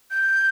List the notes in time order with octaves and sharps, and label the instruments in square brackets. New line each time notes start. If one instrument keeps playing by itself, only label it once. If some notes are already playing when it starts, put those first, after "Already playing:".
[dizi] G6